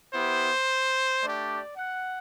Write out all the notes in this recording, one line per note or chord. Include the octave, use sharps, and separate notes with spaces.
B3 E4 G4 C5
A3 D4 G4 D5
F#5